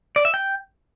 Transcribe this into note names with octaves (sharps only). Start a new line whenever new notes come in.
D5
E5
G5